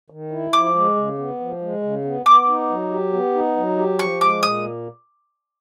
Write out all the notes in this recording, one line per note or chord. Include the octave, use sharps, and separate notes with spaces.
D#3
E4
F3 D6
G#3
C#3
B3
F3
G#3
C#3
B3
B3 D6
D#4
F#3
G4
B3
D#4
F#3
G4
F3 C#6
G#3 D6
A#2 D#6